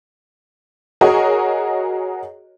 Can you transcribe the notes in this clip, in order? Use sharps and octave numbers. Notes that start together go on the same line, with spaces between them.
F#4 G#4 A#4 C#5 D#5